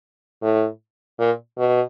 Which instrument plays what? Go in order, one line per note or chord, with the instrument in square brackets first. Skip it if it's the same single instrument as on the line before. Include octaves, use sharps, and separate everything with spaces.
[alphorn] A2
A#2
B2